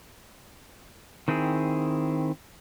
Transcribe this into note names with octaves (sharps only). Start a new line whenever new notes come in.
D#3 C4 E4 G#4